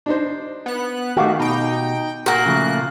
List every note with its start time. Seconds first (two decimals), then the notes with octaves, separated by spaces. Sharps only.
0.06 D4 D#4 C5
0.66 B3 F#6
1.17 D#3 A3 F#4 G4 F5 D6
1.39 B2 D#4 G5
2.26 A#2 A#3 F#4 F#6
2.46 C#3 F3 A3